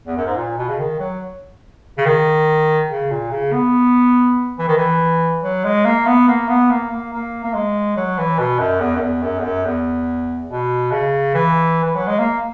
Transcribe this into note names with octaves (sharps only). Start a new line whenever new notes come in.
E2
F#2
G#2
A#2
B2
C#3
D#3
F#3
C#3
D#3
C#3
A#2
C#3
B3
E3
D#3
E3
F#3
G#3
A#3
B3
A#3
B3
A#3
A#3
A#3
A#3
G#3
F#3
E3
B2
F#2
E2
F#2
E2
F#2
E2
F#2
E2
B2
C#3
E3
E3
F#3
G#3
A#3